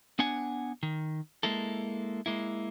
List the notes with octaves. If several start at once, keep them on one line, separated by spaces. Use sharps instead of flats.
B3 D4 F#5 G#5
D#3
G#3 A#3 E4 A4
G#3 A#3 E4